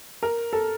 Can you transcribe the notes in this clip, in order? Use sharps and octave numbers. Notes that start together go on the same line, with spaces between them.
A#4
A4